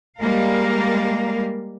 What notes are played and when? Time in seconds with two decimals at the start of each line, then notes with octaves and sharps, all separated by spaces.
0.20 G3 G#3 A#3 A#4 F5